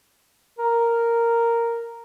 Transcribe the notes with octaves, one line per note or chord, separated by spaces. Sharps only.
A#4